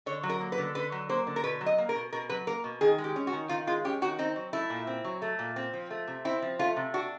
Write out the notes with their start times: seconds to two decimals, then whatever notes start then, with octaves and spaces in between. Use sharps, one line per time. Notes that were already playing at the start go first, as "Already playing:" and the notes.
0.06 D3 C#5
0.23 F#3
0.29 A#4
0.40 A#3
0.52 B4
0.58 D3
0.75 D3 B4
0.92 F#3
1.09 A#3 C5
1.27 D3
1.36 A#4
1.44 B2 B4
1.61 F#3
1.66 D#5
1.78 A#3
1.89 A#4
1.95 B2
2.13 B2 A#4
2.29 F#3 B4
2.47 A#3 A#4
2.64 B2
2.81 D#3 G#4
2.98 G#3
3.04 G4
3.16 C#4
3.27 F#4
3.33 D#3
3.49 D#3 F4
3.67 G#3 F4
3.84 C#4 G4
4.02 D#3 F#4
4.19 C4 D#4
4.36 F#3
4.53 A3 E4
4.70 A#2
4.87 C4
5.05 F#3
5.22 A3
5.39 A#2
5.56 C4
5.73 F3
5.90 A3
6.08 C3
6.25 C4 E4
6.42 F3
6.59 A3 F4
6.76 C3
6.94 D4 F#4